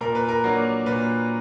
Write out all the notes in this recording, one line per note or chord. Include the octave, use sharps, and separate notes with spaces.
A#2 A#4
B4
A#4
F#3 A#3 D4
A#2 B4